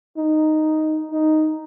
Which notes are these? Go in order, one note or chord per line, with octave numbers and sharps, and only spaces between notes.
D#4
D#4